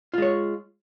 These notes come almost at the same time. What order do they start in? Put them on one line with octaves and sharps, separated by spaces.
F4 G#3 C#5